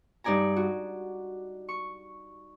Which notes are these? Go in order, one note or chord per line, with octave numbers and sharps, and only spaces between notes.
G2 D#4 D5 G#5 A#5
F#4
C#6